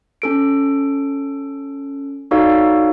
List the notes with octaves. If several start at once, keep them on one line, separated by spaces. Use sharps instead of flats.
C#4 A4 D7
D#4 F#4 A4 C#5 D5 F5